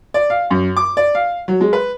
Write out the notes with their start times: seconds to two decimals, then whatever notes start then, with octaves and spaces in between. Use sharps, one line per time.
0.14 D5
0.30 F5
0.50 F#2
0.77 D6
0.97 D5
1.15 F5
1.48 F#3
1.61 G#3
1.73 B4